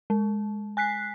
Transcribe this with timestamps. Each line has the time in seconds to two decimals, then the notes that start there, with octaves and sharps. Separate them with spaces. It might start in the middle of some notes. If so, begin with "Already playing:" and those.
0.10 G#3
0.77 G#5 F#6 B6 C7